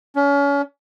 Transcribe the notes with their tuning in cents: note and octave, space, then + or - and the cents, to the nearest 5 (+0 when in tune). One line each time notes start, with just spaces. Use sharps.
C#4 +35